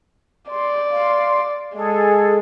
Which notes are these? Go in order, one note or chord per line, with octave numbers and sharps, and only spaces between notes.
D5 C6
F5 C6
G#3 G#4 A4